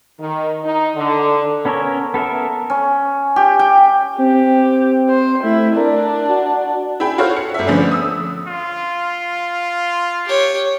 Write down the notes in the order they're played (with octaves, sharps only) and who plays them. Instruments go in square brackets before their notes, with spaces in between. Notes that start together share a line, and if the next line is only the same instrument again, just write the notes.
[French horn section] D#3
D#4
D3
[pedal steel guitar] B3 C#4 A4 A#4 C#5
B3 A4 A#4 E5
[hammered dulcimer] C#4
G4
G5
[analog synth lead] C4 [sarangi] G4
[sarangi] C5
[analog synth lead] A3 [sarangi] E4
[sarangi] D4 [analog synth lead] A#4
[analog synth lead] F#4
[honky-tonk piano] E4 G#4 G5 B5
F4 F#4 A4 C5 C#5 F6
F#5 C#7
G1 E5
D3 F3 A3 B3 C#4
D#6 E6
[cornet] F4
[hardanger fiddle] G4 C#5